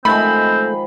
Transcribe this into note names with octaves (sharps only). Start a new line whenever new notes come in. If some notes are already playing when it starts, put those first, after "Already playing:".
D#3 F3 G#3 A3 C4 B5